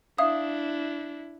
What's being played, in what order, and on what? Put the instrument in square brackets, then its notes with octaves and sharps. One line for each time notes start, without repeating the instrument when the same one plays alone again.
[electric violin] D4 E4 [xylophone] E5 F5 D#6